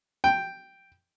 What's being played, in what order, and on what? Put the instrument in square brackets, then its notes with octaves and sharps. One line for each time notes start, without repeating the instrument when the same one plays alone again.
[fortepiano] G5